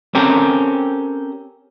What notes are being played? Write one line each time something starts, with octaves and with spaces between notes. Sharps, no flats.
C4 C#4 G4 A4 A#4